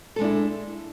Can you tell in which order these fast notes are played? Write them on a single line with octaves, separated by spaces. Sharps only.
A4 G#3 D4 E4